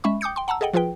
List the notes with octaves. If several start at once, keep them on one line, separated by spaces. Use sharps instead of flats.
G#3 C#4 E5 B5 C#6
G5 D6 D#6 G6 C#7
G5 C6
F#5 A5 A#5 E6
G#4 A4 D#5 F#5 G5
F3 F4 G#4 B4 G5